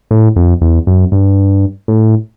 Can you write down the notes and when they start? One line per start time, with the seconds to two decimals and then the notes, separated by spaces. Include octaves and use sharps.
0.11 A2
0.36 F2
0.61 E2
0.87 F#2
1.12 G2
1.88 A2